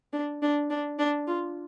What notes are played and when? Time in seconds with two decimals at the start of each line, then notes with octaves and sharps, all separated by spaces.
0.13 D4
0.42 D4
0.70 D4
0.99 D4
1.27 F4